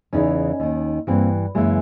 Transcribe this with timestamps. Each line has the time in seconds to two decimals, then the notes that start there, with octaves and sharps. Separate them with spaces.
0.13 E2 C#3 E3 C#4 D#4
0.60 D#2 D#3
1.07 G2 E3 A#3 C4
1.55 F#2 C#3 E3 G#3 A#3